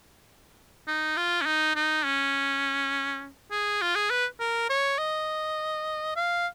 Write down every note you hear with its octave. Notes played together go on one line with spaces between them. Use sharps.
D#4
F4
C#4
D#4
D#4
C#4
G#4
F4
G#4
B4
A#4
C#5
D#5
F5